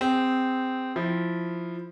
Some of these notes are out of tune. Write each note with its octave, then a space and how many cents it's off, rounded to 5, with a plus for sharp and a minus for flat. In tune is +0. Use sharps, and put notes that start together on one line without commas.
C4 -15 G#4 -20
F3 +0 E4 +0